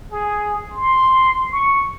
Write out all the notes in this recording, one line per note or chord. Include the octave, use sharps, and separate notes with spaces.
G#4
C6
C#6